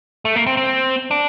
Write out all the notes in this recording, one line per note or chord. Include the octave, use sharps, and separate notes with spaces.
A3
A#3
C4
C4
D4